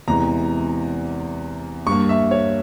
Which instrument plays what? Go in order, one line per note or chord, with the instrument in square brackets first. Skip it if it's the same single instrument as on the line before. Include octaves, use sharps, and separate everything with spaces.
[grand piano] E2 C3 E3 G#3 A#5
G2 G3 A#3 C#6
E5
C#5